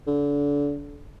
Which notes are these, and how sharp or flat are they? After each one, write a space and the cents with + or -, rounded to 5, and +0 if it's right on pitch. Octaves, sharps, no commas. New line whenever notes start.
D3 -30